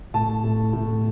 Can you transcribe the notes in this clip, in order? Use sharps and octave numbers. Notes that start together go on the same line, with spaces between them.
A2 A5
A2
A2